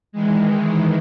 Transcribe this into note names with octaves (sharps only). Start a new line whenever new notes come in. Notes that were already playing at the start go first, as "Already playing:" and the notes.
D#3 E3 G#3